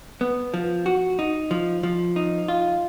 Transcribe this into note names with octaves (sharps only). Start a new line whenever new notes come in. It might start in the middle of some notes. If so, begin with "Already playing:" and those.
B3
F3
F#4
D#4
F3
F3
D#4
F4